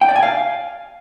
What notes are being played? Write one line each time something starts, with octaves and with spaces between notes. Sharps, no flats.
G5
D5
G#5
F5